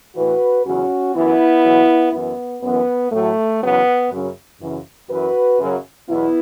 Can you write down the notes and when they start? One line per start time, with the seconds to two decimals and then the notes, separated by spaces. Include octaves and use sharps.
0.15 A2 E3 F#4 B4
0.65 E2 C#3 F#3 C#4 F#4
1.14 F#2 E3 B3 E4
1.64 E2 B2 F#3
2.13 F#2 E3 B3
2.62 F#2 E3 B3
3.12 A2 F#3 A3
3.61 E2 C#3 F#3 B3
4.10 F#2 C#3 F#3
4.60 F#2 C#3 E3
5.09 F#2 E3 F#4 B4
5.59 F#2 C#3 F#3
6.08 E2 B2 F#3 B3 E4